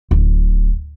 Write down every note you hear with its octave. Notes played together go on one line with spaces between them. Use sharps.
D1